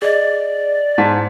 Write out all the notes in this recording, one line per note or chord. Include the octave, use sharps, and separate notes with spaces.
G#4 D5 D#5
G#2 A5 B6